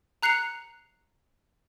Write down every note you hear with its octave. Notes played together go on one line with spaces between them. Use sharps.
A#5 F#6 C7 C#7 F7